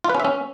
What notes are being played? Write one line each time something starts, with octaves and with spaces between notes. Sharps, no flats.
F4
B4
C#4
E5
C#4